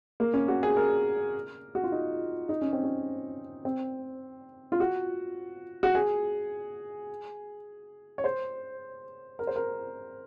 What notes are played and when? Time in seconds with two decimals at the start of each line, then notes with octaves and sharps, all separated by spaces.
0.20 A#3
0.34 C#4
0.48 F#4
0.63 G#4
0.77 A#4
1.75 F#4
1.84 F4
1.92 D#4
2.49 D#4
2.61 C#4
2.73 C4
2.83 C#4
3.65 C4
4.72 F4
4.80 F#4
5.83 F#4
5.95 G#4
8.18 C#5
8.24 C5
9.39 A#4
9.47 C5
9.56 A#4